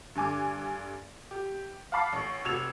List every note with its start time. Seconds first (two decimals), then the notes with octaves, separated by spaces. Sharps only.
0.15 G2 D3 G#5 D6
1.31 G4
1.92 F5 F#5 A5 B5 D6 C7
2.13 A1 C#6
2.45 F1 F#4 E6 G#6 E7 F7